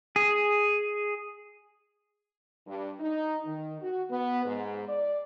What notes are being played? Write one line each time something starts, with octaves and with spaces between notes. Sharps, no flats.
G#4
G2
D#4
D#3
F#4
B3
G#2
D5